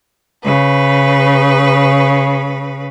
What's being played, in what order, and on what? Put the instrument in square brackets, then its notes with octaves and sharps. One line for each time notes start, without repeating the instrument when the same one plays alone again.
[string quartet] C#3 B4